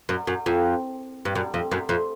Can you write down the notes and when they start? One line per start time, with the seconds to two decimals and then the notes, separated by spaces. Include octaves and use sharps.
0.09 F#2
0.27 F#2
0.46 F2
1.25 G2
1.35 F#2
1.54 F2
1.72 F#2
1.89 F2